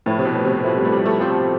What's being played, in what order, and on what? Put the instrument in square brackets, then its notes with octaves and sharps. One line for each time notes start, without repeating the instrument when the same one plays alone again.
[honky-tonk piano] A2 [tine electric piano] F3 A3 E4 B4
[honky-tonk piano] C3
B2
C3
[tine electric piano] F3 A3 E4 B4
[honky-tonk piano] G3
A3
G3
A3
[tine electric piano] F3 C4 G4 C5